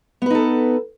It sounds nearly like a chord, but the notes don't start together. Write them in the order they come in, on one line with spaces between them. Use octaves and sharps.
B3 B4 D#4 A4